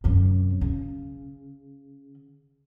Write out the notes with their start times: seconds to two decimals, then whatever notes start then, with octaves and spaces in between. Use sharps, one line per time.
0.04 F#2 C3
0.61 C#3